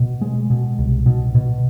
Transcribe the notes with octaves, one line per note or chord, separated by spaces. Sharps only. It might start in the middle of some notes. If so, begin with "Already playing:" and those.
Already playing: B2
G#3
B2
C2
B2
B2